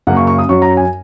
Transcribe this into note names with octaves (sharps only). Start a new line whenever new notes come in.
F#2 C#3 A#3 F#5
C#6
C#6
D#6
F#2 F#3 C#4 C#6
A#5
G#5